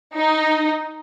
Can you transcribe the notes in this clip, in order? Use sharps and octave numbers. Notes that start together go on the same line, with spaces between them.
D#4